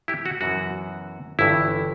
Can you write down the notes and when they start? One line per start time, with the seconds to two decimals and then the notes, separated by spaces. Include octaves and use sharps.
0.08 E4 G4
0.26 F#4
0.41 F#2 E3 B3 F#4
1.39 G1 G2 E3 E4